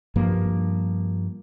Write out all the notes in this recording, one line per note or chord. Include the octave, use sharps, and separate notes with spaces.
G2 F3 A#3